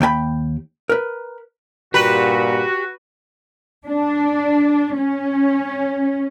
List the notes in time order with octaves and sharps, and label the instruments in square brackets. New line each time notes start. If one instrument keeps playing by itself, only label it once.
[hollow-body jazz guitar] D#2 G5 G#5 B5
A#4 B4
[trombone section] G2 A#2 [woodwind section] F#4 [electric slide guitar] G4 [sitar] B4
[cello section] D4
C#4